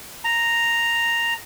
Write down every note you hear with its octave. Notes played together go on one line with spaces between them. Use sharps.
A#5